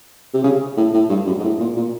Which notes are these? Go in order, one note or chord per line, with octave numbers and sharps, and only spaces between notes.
C3
C#3
A2
A2
G2
F#2
G#2
A2
A#2
A#2